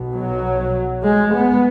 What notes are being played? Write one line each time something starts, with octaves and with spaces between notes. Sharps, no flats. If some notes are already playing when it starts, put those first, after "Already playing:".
Already playing: B1 B2
F#3
G#3
B3